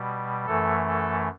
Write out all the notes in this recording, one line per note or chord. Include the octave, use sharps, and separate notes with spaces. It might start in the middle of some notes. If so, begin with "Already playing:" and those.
Already playing: B2 G3
F#2 E3 A3 A4
A4